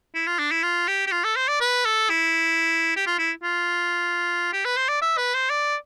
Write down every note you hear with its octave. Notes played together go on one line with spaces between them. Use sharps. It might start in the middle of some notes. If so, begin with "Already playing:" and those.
E4
F4
D4
E4
F4
G4
G4
F4
A4
C5
D5
B4
A4
E4
G4
F4
E4
F4
G4
B4
C5
D5
E5
B4
C5
D5